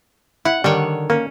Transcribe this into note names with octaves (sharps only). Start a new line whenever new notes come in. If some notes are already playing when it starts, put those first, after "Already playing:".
E4 F#5
D3 D#3 G3 C#5
A#3 C#4